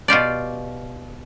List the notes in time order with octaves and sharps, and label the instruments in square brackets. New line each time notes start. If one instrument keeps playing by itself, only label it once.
[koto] B2 F4 G4 D5